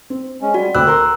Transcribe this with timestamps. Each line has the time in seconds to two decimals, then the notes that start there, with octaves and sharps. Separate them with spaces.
0.10 C4
0.42 G#3 C#4
0.54 G3 F#4
0.75 D2 C4 B5 D6 E6 F#6
0.87 A#4 A#5 C6